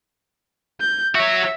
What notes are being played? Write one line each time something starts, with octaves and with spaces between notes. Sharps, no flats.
G6
F#4 C#5 E5